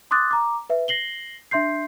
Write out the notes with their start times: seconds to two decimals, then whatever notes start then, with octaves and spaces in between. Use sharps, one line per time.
0.11 C6 D6 D#6 F#6 A6
0.31 A#5 D6
0.70 B4 E5
0.88 A#6 C7 F#7 G7
1.51 D4 E5 C6 G6 C7